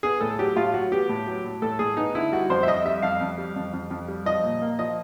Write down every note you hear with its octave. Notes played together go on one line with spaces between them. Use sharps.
B3 G#4
A2 A4
F#3 G4
A2 F4
F#3 F#4
B3 G4
A2
F#3
A2
A2 A4
A2 G#4
B3 D#4
D3 E4
G3 F#4
F2 C5
E5
F2 D#5
G3 E5
F2 F5
F2
G3
F2
F2
F2
G3
F3 D#5
A#2
A#3
F3 D#5